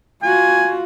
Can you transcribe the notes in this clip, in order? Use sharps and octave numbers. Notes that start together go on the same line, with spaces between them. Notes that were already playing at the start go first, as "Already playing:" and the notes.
F4 F#4 G#5